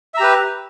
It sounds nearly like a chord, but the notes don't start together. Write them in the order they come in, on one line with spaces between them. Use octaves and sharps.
E5 A#5 G4 B4